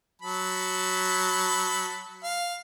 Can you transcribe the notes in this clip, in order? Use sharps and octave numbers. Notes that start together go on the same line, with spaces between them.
F#3 A5 B5
F5